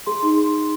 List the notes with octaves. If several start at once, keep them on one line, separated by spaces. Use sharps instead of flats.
G#4 C6
D#4